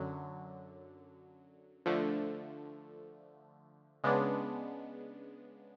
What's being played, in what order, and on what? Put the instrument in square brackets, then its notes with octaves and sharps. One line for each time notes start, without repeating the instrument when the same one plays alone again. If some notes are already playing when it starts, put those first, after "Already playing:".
Already playing: [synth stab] F#2 D3 F#3
D3 F3 A3
C#3 G#3 B3 D4